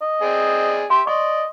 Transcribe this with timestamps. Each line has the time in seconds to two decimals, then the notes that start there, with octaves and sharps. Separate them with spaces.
0.02 D#5
0.22 C4 G#4 D5
0.90 G4 E5 C6
1.07 D5 D#5 C#6